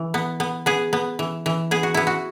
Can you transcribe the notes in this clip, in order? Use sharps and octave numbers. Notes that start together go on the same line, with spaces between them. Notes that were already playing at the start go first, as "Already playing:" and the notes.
Already playing: E3
B3
B3
B3 G#4
B3
E3
E3
B3 G#4
F#4
B3 E4
F#4